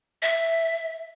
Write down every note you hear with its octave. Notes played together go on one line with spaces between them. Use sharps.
E5